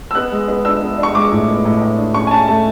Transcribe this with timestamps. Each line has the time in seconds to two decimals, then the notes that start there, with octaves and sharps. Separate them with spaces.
0.11 E6
0.15 B3 F#6
0.32 G#3
0.48 B3
0.65 D4 E6
0.82 B3
0.98 D4
1.03 C#6
1.15 G#3 D6
1.32 A2
1.48 B3
1.65 A2
1.82 A2
1.98 D4
2.14 C#4 C#6
2.27 G#5
2.31 C#4 A5
2.48 A3 A5